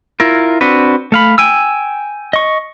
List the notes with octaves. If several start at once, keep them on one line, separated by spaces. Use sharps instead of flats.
E4 F4 A#4
C4 D4 F#4 B4
A3 F5 B5
G5 G#5 E6
D#5 C#6